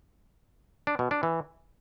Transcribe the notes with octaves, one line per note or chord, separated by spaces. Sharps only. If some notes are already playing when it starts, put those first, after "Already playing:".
D4
B2
D4
E3